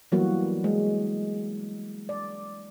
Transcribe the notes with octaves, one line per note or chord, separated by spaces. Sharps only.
E3 F#3 G3 A#3 B3 F#4
G#3
D5